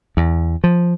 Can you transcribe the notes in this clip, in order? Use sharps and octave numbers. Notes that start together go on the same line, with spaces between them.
E2
F3